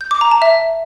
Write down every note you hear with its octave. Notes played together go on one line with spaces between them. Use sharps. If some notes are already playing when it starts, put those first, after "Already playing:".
G6
D6
A#5
A5
E5